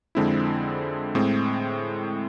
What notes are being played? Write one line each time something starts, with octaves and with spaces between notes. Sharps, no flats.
F2 D3 G#3 C4 E4
A2 G#3 C4